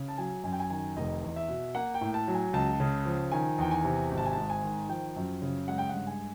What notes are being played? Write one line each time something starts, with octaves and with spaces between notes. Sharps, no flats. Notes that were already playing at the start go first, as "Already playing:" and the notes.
Already playing: C#3
A5
F#3 G#5
F#2 G#5
G5
G#5
D#3 G#5
F1 D#5
E2
E5
B2
A#3 F#5
G5
A2
A5
F#3
G#5
C#2 A5
C#3
F3
D#3 G#5
E2 G5
G#5
C3
G#1
A5
G#5
G#2 A5
G#5
D#3
F3 G5
F#2
C#3
G#3 F#5
G5
G2 F#5
G#5